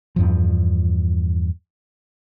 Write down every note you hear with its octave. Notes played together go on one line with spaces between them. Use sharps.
E2 G2 F3